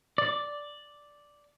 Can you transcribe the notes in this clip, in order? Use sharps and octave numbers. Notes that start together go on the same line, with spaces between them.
D5